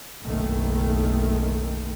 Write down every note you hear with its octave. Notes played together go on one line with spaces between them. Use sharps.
F#1 B1 D#3 A3